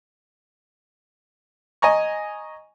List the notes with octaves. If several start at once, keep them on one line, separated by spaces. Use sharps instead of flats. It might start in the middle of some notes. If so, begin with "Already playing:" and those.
D#5 G#5 A#5 C#6